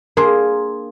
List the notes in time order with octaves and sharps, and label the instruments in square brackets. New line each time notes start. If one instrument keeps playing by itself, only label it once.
[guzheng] A#3 D4 G#4 [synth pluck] A#4 C6